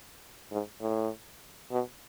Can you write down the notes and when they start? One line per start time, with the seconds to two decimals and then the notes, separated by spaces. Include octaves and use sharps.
0.51 G#2
0.81 A2
1.71 B2